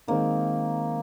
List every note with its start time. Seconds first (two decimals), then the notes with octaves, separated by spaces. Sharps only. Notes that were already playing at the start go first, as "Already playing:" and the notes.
0.08 D#3 G#3 A#3 C4 D#4